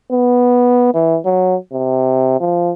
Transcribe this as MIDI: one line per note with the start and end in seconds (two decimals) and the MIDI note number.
0.12 0.90 59
0.94 1.18 52
1.25 1.55 54
1.73 2.37 48
2.40 2.72 53